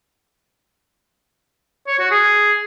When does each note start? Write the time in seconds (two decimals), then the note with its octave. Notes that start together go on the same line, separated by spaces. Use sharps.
1.87 C#5
1.99 F#4
2.11 G#4